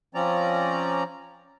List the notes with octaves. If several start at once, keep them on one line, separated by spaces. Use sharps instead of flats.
F3 C4 C#4 D5 A#5